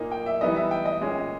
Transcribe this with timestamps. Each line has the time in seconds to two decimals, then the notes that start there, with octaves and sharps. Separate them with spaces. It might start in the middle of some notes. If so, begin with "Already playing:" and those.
Already playing: A#2 A#3 D#4
0.11 G5
0.26 E5
0.41 E3 G3 B3 D#4 D#5
0.56 E5
0.71 G5
0.86 D#5
1.01 A#2 G#3 C#4